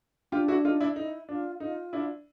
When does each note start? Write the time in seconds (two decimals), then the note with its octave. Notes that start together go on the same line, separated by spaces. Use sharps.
0.32 D4 F4 G4
0.48 E4 F#4
0.65 D#4 F4
0.80 D4 E4
0.96 D#4 E4
1.29 D4 F4
1.60 D#4 F4
1.93 D4 E4